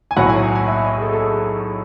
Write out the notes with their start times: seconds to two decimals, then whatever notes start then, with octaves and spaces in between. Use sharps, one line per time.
0.11 G#5
0.17 B1 A2 F#3 F#5
0.29 G#5
0.55 G#5
0.68 E5
0.86 D#5
0.98 G#4
1.02 A4
1.13 A4
1.20 G#4